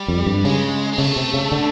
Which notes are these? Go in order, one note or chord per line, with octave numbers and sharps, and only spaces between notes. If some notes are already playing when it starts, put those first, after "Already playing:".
Already playing: G3
F2
G2
C#3 G#3
G#3
C#3 A3
C3
C#3
D3